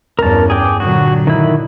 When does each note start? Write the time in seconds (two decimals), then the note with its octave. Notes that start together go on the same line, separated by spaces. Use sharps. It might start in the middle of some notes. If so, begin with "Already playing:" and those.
0.19 E2 G2 C#4 A#4 A5
0.50 G#4 G5 D6
0.80 A#2 D3 F#3 F#4
1.27 D#3 E4